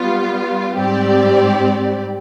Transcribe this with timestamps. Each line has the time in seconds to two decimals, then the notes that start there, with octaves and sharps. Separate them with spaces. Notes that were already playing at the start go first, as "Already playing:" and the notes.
Already playing: G3 B3 F4
0.76 G#2 G3 C4 G4 D5